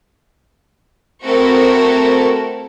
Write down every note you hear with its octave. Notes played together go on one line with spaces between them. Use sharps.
A3 C4 E4 F#4 A4 A#4